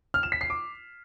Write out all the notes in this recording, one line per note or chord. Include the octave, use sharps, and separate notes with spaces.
F6
E7
B6
C7
D6